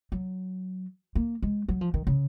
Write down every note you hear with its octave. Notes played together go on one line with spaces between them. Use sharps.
F#3
A#3
G#3
F#3
F3
D#3
C#3